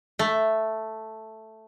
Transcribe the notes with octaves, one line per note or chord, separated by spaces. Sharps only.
A3